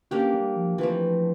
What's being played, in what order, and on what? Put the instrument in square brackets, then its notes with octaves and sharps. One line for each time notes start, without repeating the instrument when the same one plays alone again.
[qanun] A#3 D4 G4 [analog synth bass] C#4
[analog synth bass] G3
F3
[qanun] E3 A3 C4 [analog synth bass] F3